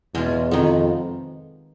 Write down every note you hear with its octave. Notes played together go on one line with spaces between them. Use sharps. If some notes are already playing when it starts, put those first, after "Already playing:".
E2 B2 G#3 C#4 F4 G#4
F2 C3 D#3 G#3 B3